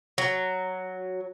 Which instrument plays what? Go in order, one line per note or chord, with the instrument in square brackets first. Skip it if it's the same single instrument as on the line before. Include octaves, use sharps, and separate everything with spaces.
[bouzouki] F#3